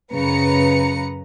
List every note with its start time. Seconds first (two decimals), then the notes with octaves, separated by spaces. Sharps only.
0.13 F#2 C#3 B4 A#5 C#7